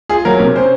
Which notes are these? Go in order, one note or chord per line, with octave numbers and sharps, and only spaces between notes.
F4 G#4
F#3 A#4
C3 A#4
C#4 C5